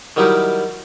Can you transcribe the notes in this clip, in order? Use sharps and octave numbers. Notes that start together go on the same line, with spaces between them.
D#3 F#3 G3 D#4 E4 A#4